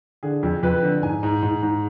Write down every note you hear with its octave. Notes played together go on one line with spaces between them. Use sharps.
D3 G#4
F2
F2 B4
D3
G#2 G#5
G#2
G#2
G#2